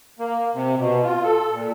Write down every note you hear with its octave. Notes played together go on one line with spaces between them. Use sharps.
A#3
C3
B2
F4
A4
A#2